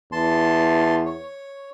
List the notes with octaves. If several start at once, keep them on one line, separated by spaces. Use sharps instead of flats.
E2 A5 C6
C#5